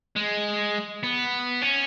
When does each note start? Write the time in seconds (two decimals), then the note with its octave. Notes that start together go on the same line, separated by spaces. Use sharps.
0.16 G#3
1.03 B3
1.62 C#4